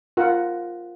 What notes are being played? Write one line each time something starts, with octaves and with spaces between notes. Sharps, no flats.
F4 A#4 F#5